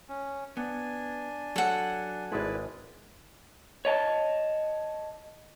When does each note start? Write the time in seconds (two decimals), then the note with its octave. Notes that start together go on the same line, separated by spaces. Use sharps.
0.09 C#4
0.57 B3 D4 G#5
1.56 F#3 A4 F#5
2.32 G#1 G#3 E4 B4 D5
3.85 C#5 D#5 A5